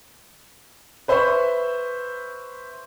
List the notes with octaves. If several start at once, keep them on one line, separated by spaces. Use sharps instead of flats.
B4 C5 E5 B5 C#6